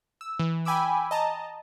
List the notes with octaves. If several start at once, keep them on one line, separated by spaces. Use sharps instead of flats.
E6
E3
G5 G#5 B5 D6 E6
D#5 A5 A#5